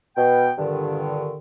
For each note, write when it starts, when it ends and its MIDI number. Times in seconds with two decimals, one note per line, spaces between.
0.17 0.50 47
0.17 0.50 79
0.58 1.38 43
0.58 1.38 46
0.58 1.38 50
0.58 1.38 51